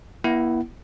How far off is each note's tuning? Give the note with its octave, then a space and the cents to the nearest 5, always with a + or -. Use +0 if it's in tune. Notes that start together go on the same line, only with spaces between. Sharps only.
B3 -45 E4 +0 F#5 +25